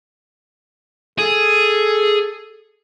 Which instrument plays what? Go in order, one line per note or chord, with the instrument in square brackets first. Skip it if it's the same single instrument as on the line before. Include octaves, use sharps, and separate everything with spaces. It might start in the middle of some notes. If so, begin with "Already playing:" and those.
[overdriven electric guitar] G#4 [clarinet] A4